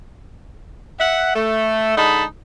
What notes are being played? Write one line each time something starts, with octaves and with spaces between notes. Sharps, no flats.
E5 F#5
A3
D3 G#3 D#4 A5 B5